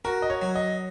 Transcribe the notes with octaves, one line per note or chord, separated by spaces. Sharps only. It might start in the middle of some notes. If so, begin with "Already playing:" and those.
F#4 A#4
D#5
C#5
F#3
D#5